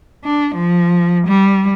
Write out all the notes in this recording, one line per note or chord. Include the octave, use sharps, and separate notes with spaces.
D4
F3
G3